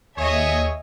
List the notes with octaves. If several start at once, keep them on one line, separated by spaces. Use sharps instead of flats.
D#2 G#4 C#5 D#5 E5 G#5